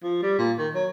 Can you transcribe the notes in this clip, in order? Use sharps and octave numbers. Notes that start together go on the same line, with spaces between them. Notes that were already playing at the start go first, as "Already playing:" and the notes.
F3
G3
A#2
D#3
F#3